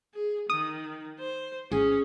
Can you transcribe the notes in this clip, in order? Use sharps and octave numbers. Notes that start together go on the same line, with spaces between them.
G#4
D#3 D#6
C5
A1 C#4 G#4